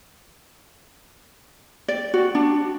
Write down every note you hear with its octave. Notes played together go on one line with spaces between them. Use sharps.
D5
F#4
D4